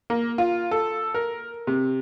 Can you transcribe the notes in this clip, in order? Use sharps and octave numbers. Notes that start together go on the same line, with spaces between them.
A#3
F4
A4
A#4
C3